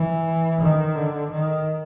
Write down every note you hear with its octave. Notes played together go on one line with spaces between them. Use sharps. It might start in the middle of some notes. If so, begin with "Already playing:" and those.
Already playing: E3
D#3
D3
D#3